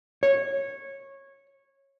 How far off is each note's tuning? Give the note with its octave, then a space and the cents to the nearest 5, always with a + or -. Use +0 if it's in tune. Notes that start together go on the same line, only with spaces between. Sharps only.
C#5 -15